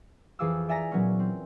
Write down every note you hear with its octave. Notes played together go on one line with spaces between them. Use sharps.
F2 E3 G#4 F5 D6 E6
D5 E5 G#5 A#5 A#6 C#7
A#2 F#3 B3 C#4
C4